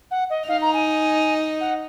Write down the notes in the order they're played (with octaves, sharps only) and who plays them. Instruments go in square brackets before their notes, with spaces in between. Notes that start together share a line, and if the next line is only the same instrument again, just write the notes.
[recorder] F#5
D#5
[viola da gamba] D#4 [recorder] F5
[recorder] A#5
G#5
F#5